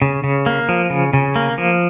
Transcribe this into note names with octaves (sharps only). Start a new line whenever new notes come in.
C#3
C#3
A#3
F3
C#3
C#3
A#3
F3